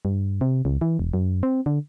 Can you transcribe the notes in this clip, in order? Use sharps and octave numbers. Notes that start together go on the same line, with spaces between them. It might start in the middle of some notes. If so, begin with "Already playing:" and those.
G2
C3
C#2
E3
E1
F#2
C4
D3